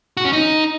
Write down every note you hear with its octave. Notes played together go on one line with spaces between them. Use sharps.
F#4
C#4
D#4